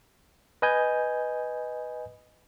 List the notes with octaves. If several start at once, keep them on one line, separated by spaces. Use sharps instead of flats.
B4 D#5 G#5 G6